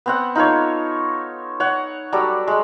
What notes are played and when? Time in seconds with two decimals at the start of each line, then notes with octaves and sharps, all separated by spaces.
0.06 B3 C4 F#5
0.35 D#4 F4 A4 C#5
1.60 C#5 F#5
2.13 F#3 G3 A4 D5
2.48 G#3